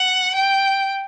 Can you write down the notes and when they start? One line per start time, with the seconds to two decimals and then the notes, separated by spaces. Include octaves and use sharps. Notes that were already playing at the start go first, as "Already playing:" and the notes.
Already playing: F#5
0.34 G5